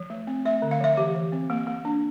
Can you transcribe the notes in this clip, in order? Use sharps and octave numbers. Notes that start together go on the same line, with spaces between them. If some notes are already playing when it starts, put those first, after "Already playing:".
Already playing: F3
A3
C4
A3 E5
D3
F5
F3 E5
E3 G4
E3
C4
A#3
A#3
D4